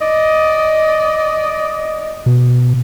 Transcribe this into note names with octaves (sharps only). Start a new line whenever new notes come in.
D5 D#5
B2